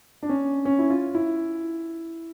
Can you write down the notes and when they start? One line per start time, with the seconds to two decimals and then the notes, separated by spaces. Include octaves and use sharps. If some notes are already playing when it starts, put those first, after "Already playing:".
0.23 D4
0.29 C#4
0.65 C#4
0.79 E4
0.90 F4
1.15 E4